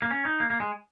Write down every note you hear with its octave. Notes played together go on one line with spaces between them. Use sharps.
A#3
C#4
D#4
A#3
A#3
G#3